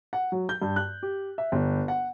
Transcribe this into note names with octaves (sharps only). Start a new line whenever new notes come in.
F#5
F#3
G6
G2
F#6
G4
E5
G1
F#5